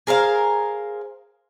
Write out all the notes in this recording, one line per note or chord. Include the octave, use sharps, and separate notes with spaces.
G#4 A#4 C5 F5